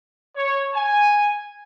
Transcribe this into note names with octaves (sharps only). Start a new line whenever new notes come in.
C#5
G#5